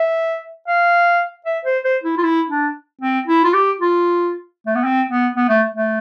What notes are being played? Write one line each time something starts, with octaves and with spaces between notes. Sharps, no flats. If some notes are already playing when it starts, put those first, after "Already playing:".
Already playing: E5
F5
E5
C5
C5
E4
F4
E4
D4
C4
E4
F4
G4
F4
A3
B3
C4
B3
B3
A3
A3